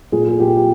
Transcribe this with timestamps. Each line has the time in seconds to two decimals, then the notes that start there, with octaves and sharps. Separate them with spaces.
0.12 A#2 G#4
0.28 G#4
0.40 A#2 G4
0.57 G4